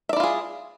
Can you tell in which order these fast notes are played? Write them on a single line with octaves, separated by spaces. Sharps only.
E5 D5 E4 F4 G#4